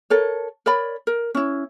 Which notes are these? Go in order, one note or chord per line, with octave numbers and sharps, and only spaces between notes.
A4 A#4 C#5
A#4 C#5 D5 B5
A#4
C#4 E4